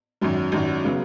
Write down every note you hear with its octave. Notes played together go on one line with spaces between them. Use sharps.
G#1 F#2 F#3
G#1 F#2 F#3
C#3 F#3 B3